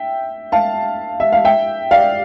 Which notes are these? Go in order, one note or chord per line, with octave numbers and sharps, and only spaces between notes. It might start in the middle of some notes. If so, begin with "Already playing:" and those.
Already playing: E5 G5
F5 A5
E5
F5
E5 G5
D5 F5